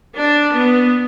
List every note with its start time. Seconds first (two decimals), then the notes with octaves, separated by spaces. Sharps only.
0.17 D4
0.54 B3